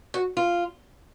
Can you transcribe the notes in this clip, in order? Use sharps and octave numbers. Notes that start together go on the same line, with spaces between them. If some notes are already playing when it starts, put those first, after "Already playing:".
F#4
F4